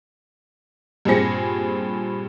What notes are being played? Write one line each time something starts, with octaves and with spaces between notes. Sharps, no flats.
G2 A#2 C4 G#4 A#6 C#7